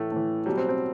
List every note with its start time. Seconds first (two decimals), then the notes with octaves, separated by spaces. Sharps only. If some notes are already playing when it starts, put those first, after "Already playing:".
Already playing: A2 E3 A3
0.12 A2 E3
0.46 B2 F#3 G3
0.57 C4
0.69 C4